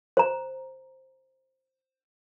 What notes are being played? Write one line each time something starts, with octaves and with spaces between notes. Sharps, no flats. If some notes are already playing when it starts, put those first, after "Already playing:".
C5 A#5